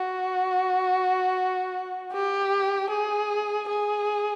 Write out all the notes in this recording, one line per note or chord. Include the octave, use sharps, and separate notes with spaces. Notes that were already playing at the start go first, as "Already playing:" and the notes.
Already playing: F#4
G4
G#4
G#4